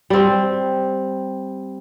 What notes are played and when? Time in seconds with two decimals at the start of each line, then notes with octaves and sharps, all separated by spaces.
0.10 G3 C4